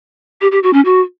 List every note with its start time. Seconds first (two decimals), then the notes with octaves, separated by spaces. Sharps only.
0.41 G4
0.52 G4
0.63 F#4
0.73 C#4
0.85 F#4